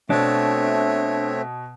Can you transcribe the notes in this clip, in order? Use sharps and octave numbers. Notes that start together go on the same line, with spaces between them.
B2 A3 C4 D4 C#5 E5